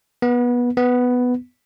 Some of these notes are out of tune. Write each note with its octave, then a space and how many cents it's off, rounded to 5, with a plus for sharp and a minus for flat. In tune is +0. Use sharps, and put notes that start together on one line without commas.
B3 -20
B3 +5